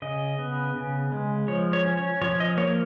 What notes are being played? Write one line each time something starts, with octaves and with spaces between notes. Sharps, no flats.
C#3 D#5
B3
C#3
G#3
F3 C#5
C#5
C#4
C#5
F3 C#5
D#5
A#3 C#5